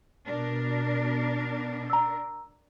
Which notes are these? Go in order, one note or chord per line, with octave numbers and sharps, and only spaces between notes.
B2 D4 A#4
A#5 E6